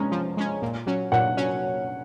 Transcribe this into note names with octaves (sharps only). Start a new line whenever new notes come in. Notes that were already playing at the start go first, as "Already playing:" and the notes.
Already playing: F3 G#3 C#4 A#5
F3
G#3 C#4
A#2
F#3 C#4
A#2 F#5
F#3 C#4